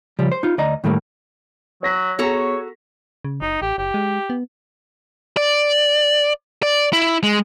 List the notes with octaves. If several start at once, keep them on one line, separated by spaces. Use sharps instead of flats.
C#3 F3 G3
C5
D#4 F4
D2 D5 D#5 A#5
A2 D#3 G3 A3 A#3
F#3 C#5 A#6 B6
B3 F#4 G#4 A4 C#5 A#5
C#3
F#1 D#4
A1 G4
F#1 G4
G#3
B3
D5
D5
E4
G#3